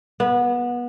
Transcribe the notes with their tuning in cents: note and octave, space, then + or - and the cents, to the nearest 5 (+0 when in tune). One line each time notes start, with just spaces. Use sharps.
B3 -25